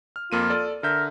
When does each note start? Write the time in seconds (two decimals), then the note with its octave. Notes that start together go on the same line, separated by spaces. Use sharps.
0.16 F6
0.32 F2 A#3 F4 D#7
0.50 A4 D5
0.83 D3 A#4 E5 G6